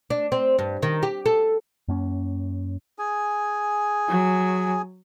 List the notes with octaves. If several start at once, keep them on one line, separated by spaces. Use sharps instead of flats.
D4
C4
G2
D#3
G4
A4
F#2 A#3 C#4
G#4 G#5
F#3